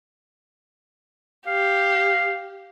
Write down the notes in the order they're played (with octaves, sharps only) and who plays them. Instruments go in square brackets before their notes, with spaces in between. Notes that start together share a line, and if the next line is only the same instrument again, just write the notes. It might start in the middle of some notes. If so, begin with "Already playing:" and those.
[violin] G4 [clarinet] F5